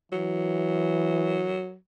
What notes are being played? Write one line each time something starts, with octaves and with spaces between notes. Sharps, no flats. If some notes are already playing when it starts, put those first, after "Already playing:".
E3 F#3